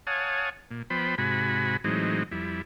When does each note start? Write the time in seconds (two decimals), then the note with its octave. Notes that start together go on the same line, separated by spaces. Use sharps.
0.07 C#5 F5 F#5 G#5 A5 D#6
0.71 A#2
0.90 F3 B3 C5 G5 B5
1.18 G#2 C3 F#4 G#5 B5
1.84 A2 E3 F#3 G#3 C4 D#4
2.31 F2 G3 E4